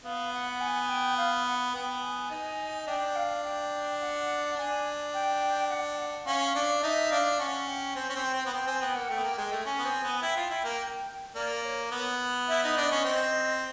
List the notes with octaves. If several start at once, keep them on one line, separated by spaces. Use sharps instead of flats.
B3 F5
F#5
G#5
G5
F5
F#5
B3 G5
G#5
D#4
D4 G5
F5
G5
F#5
D4 G#5
G5
F#5
G5
F#5
C#4 F5
D4
D#4 E5
D4 F5
C#4 F#5
G5
C4 G#5
C#4
C4
G5
C4
B3
C4 G5
C4 G#5
B3 G5
A#3 F#5
A3 G5
B3
A#3
G#3 G5
A3
C#4 G#5
B3
C4
B3
E4 G5
F4
E4
A#3
A#3 D5
C#5
B3
E4 E5
D#4
D4 D#5
C#4
C4